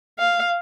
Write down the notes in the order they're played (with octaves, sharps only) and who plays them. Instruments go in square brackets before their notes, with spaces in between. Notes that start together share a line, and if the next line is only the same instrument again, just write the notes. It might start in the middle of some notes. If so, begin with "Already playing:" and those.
[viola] F5